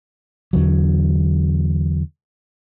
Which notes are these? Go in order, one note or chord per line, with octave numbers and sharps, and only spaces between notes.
E2 D3 F#3